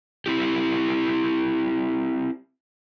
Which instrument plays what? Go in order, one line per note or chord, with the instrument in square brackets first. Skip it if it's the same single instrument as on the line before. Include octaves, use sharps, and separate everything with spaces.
[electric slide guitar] C4 E4 G4